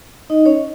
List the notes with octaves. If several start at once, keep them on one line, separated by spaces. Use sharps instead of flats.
D#4 D#5
C#4 C#5